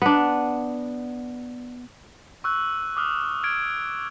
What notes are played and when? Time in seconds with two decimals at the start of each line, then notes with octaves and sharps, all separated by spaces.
0.02 B3 D4
2.44 C#6 E6 F#6
2.97 D6 D#6 F6
3.43 F6 G#6 D7